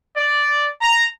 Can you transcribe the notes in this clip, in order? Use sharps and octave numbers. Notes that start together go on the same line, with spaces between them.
D5
A#5